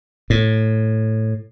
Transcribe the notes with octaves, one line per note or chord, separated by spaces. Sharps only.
A2